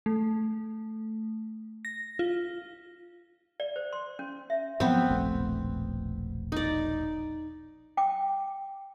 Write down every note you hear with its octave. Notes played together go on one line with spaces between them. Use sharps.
A3
A#6
F4
D5
C5
C6
C#4
E5
G#2 F3 F#3 B3 C4
E1 A#1 A3
D#4 D5
G5 D6